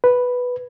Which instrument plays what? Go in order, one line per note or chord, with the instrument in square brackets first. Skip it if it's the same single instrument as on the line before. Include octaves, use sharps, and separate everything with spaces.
[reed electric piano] B4